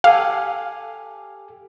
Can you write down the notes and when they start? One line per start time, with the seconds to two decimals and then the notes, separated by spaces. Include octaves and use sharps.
0.04 G4 A4 F5 G#5